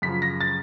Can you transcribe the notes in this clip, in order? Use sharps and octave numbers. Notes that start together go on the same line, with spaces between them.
F#2 C#3 F3 B6
A#6
A6